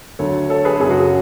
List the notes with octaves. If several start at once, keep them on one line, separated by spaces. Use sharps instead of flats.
D2 D3 F#3 A4 C#5
A4 C#5
G#4 B4
F#2 C#3 F#3 G#4
F#4
G#4